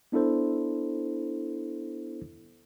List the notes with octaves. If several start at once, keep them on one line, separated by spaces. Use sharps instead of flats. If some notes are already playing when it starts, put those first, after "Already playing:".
B3 D4 E4 A4 C5